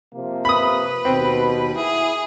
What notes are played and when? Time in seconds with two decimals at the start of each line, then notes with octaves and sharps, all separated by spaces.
0.14 C3 F3 A#3
0.45 B4 B5 D#6
1.05 D#2 B2 C4
1.75 E4 G#4